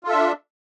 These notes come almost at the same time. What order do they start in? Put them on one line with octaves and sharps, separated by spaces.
F4 A4 E5 D4